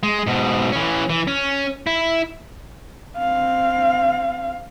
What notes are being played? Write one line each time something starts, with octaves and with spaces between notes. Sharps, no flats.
G#3
G#2 B2
E3 C#4
E3
C#4
E4
C4 F5